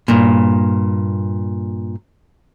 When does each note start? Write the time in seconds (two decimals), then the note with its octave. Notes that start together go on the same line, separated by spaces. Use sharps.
0.08 G2 A#2